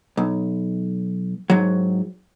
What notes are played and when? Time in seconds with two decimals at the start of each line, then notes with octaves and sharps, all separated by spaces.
0.17 B1
1.50 G#2 F#3